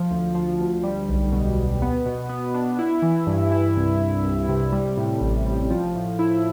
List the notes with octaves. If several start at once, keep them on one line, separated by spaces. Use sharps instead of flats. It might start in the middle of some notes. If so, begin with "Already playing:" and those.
Already playing: F3
D2
F3
D2
G3
B1
B2
B1
B3
B2
B3
D4
E4
E3
G2
E4
C2
C2
C2
C3
G3
A2
A1
G3
F3
A2
E4